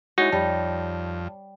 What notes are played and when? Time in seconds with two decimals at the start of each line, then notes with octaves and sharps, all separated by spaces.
0.18 G#3 D#4 E4 F#4 C#5
0.32 F2 G3 A5